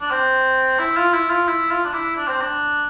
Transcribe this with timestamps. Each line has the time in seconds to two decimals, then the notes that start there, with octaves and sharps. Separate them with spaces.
0.01 D4
0.11 C4
0.79 E4
0.97 F4
1.13 E4
1.30 F4
1.48 E4
1.71 F4
1.84 D4
1.93 E4
2.16 D4
2.28 C4
2.41 D4